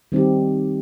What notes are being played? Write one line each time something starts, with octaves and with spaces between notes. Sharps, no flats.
D#3 G3 C4 D#4 G4